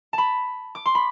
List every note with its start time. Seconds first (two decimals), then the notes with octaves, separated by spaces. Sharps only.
0.13 A5 B5
0.75 D6
0.86 C6
0.95 B5